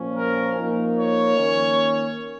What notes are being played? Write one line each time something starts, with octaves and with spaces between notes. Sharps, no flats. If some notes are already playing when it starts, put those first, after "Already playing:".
Already playing: A#2 F3 C#4
A#4
F3 A#3 D#4
C#5
D#3 A#3 C#4